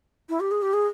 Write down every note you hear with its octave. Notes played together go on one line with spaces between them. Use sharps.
E4
G4
G#4
G4
G#4